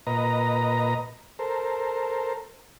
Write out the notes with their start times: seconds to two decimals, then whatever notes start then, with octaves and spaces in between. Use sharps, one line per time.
0.07 A#2 B4 D#5 A#5
1.39 A4 A#4 C5